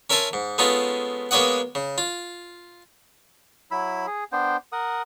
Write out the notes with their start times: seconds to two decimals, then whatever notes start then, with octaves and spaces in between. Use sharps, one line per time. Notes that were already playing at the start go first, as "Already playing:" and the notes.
0.10 C#4 A#4 E5 G#5 A5 C6
0.33 G#2
0.58 G#3 A3 B3 C#4 D#4 F4
1.31 G#3 A#3 B3 C#5 D#5 F#5
1.75 C#3
1.98 F4
3.71 F#3 E4 B5 E6
4.07 G#4
4.32 B3 D4 C5 G5
4.72 A#4 F#5 D#6